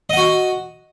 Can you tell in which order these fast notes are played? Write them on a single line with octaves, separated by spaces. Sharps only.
D#5 F#5 F#4